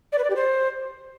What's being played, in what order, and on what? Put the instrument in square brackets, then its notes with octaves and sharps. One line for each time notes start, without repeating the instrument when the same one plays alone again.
[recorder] D5
B4
D5
G4
C5